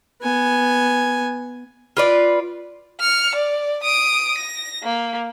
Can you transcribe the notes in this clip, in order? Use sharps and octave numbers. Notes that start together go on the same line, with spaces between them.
B3 G#5
F4 B4 D5
F6 C#7
D5
D#6 D7
A#6
A#3